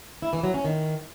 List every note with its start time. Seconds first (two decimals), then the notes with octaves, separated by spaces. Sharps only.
0.22 E4
0.33 E3
0.43 F#3
0.54 C#4
0.65 D#3